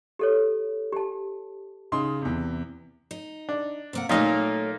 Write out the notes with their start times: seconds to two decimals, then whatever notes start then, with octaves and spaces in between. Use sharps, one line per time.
0.19 G4 A4 C#5
0.92 G4 A5
1.92 C#3 D#4 C6
2.22 E2 C3
3.11 D#4
3.49 D4
3.93 C3 A#3 F#5
4.09 A#2 F#3 A3 A#3 D#4 A#4